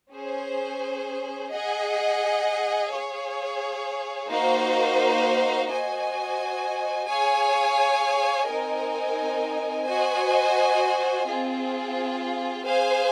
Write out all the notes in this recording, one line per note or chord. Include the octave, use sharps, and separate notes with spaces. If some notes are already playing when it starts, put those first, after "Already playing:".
C#4 G#4 C5
G#4 D#5 F#5
G#4 C#5 F5
A#3 D#4 F#4 C5 F5
F#4 C5 D#5 G#5
G#4 C#5 F5 G#5
C4 D#4 A#4 D#5 G#5
F#4 C5 D#5 G#5
C4 F4 G#4
G#4 C5 F5 G#5